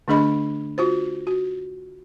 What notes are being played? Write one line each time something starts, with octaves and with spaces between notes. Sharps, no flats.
D3 A3 D4 G#4 D#5 B5
F4 F#4 C5
F#4